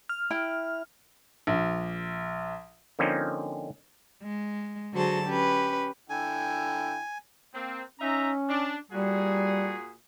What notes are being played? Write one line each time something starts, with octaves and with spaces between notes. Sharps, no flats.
F6
E4 G5
A#1
D3 F3 A#3 C4 C#4 D#4
G#3
D3 F#3 F#4 G#4 C5 A5
C#4 G4 B4
D3 E4 G5 G#5
A#3 C4
C#4 D#4 E5 A#5
D4
A#2 G3 F#4 G#4